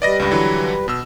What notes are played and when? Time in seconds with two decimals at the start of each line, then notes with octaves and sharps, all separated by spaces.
0.02 G3 B4 D5 D#5 A#6
0.20 C#2 G2
0.31 D3 E3 F#3
0.88 B2 E6